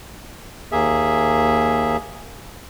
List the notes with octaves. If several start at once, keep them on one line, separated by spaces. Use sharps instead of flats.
D#2 A#3 G#4 E5